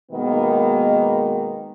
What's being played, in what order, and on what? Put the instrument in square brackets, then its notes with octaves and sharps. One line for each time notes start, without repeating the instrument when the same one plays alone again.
[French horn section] B2 D#3 G#3 A#3 B3